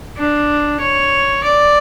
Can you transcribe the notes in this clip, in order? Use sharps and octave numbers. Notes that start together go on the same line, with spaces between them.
D4
C#5
D5